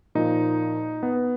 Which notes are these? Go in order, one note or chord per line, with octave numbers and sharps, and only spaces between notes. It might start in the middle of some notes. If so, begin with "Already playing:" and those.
A#2 F3 D#4
B3